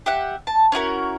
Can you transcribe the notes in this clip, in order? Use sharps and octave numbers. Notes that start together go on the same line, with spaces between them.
G4 E5 F#5
A5
C#4 E4 F#4 A#4